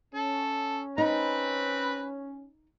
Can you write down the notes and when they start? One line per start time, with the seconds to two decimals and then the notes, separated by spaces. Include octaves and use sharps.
0.15 C#4 A4
0.98 C4 D#4 B4 B5